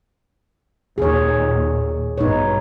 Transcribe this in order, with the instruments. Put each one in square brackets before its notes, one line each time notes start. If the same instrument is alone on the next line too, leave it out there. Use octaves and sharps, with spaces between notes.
[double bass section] D#2 A#2 [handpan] G#4 C#5
[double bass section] A1 G2 B2 [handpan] D#4 C#5